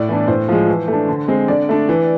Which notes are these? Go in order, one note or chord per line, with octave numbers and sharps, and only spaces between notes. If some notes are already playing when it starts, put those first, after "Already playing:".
Already playing: A2 D5
E3 B3 D4
A2 C5
F3 G#3
E3
A3 D4
D3
G#3 C4
D3 D5
A3 D4
E3